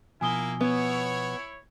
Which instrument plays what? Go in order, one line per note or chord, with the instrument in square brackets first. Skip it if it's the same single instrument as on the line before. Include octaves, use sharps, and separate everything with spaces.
[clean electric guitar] B2 F3 [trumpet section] A#3 E4 [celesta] G#5 D#6 G7
[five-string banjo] B3 [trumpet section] E4 C#5